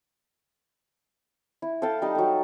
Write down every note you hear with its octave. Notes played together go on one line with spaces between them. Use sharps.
E4
A4 F5 G5 A5
G3 D#4 D#5
F#3 A4